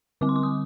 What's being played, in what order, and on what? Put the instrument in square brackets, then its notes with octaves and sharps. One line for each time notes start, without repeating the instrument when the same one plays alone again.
[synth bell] D3 G3 C4 D6
C6
D6
D#6